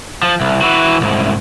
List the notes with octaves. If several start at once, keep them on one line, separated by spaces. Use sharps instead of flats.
F3
C2
E3 F#4
C2 G#2